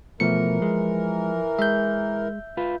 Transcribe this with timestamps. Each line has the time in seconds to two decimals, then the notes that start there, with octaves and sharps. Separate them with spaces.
0.20 B2 E3 F3 A3 A#4 C#7
0.62 G#3
1.59 G#3 E5 G6
2.57 F4 B4